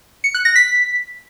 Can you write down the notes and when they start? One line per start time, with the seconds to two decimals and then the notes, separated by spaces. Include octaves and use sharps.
0.24 C#7
0.34 F#6
0.45 A#6
0.56 B6